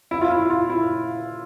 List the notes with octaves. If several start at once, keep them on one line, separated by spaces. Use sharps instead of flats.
E4
F4
E4
F4
E4